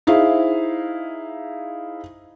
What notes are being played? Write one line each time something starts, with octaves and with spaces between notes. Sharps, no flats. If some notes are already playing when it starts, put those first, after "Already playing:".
D#4 E4 G#4 C5 F5